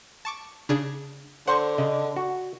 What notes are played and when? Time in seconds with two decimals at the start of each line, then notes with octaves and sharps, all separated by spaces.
0.25 A5 C#6 D6
0.69 C#3 D4 G#4
1.48 D3 C5 F#5 C6 C#6
1.78 C#3 D#5
2.16 F#4